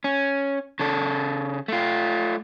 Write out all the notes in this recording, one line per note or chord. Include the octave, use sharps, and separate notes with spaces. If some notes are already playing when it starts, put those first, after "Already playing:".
C#4
C#3 A4
A3 F4